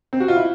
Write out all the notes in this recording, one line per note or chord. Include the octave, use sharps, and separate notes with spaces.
C4
F#4
F4
E4